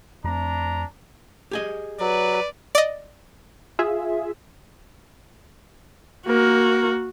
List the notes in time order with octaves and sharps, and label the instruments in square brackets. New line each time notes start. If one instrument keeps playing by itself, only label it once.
[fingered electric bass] F2 A3 C4 [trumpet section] D4 A#5
[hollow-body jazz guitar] G4 G#4 D#5
[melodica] F#3 [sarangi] B4 [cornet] D5
[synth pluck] D5 D#5
[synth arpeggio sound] F4 G#4 E5
[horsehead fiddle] A#3 A#4 [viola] F#4